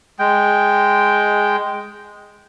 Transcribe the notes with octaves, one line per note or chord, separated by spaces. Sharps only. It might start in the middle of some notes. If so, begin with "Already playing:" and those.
G#3 G5